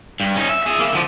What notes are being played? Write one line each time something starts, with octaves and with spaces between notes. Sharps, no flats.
G2
C#4 D#4
E5
G#4 E5
A#3 E5
D3 F3